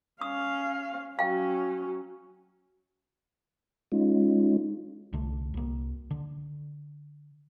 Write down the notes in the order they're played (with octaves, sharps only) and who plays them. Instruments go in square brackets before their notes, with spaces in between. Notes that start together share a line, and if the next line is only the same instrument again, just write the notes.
[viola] C#4 F5 [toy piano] D#6
[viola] F#3 C#4 [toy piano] F5 G5
[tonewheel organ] G#3 C#4 D#4 F4
[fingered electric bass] C2 D3 A3
C2 A#3
D3